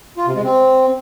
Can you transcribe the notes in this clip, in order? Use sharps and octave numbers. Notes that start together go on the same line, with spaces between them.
F4
C3
G#3
C4